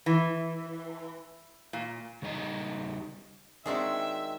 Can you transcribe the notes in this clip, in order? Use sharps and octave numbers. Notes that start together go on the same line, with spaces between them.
E3
A#2
C#3 G3 D#4 D#5 A#5
D#3 G#3 C4 D4 F#4 E5